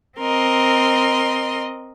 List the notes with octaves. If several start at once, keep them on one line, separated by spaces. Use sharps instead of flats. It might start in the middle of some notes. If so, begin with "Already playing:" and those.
C4 A#4 D#5 C6